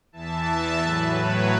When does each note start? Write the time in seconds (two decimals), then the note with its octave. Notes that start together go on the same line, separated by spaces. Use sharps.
0.12 E2 E3 E5 A5
0.79 A2 F#3 B4
1.12 C#5